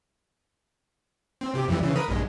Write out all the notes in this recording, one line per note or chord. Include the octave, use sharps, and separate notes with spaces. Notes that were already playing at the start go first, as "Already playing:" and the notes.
C4
C3 G4
F2 E3 G3
C#3 E3
A#4 B4 D#6
A#1 G2 G#3